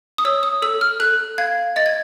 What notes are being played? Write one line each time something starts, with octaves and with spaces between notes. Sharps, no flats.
D#6
C#5 E6
D#6
A4 E6
F6
A4 F#6
F5 G#6
D#5 A6
G#6